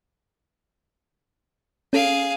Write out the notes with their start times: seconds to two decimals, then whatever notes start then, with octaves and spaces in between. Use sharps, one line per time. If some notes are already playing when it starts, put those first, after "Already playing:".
1.93 C#4 G#4 A4 F5 D7